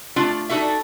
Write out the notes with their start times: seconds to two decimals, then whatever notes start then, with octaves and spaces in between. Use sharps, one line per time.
0.16 A3 D4 F4
0.49 D4 D#4 F#4 A4 E5